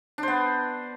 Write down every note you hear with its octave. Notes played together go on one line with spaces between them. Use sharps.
B3 D4 C5